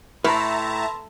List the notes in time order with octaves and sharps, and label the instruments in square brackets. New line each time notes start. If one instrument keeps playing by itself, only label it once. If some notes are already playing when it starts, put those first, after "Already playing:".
[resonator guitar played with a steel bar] A2 [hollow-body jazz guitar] B4 [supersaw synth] E5 A5 A#5 [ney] C6